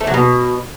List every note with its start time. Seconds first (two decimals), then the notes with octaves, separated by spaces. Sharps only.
0.01 A3
0.07 F#3
0.14 B2